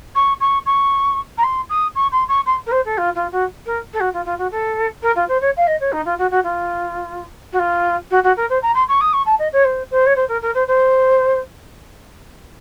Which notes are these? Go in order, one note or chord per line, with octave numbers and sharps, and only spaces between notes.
C#6
C#6
C#6
A#5
C6
D#6
C#6
C6
C#6
C6
A#4
C5
A4
F4
F4
F#4
A#4
A4
F#4
F4
F4
F#4
A4
A#4
F4
C5
C#5
F5
D#5
C#5
D#4
F4
F#4
F#4
F4
F#4
F4
F#4
F#4
A#4
C5
A#5
C6
C#6
D#6
C#6
A5
D#5
C#5
C5
C5
C#5
C5
A#4
A#4
C5
C5